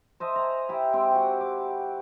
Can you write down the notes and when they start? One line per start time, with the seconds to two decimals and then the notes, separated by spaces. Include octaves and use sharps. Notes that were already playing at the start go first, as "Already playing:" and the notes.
0.20 C5 D#5 E5 A5
0.36 G#5 A#5
0.69 E4 G4 E5
0.93 G#3 C4 G4
1.11 F#4 G4
1.41 D6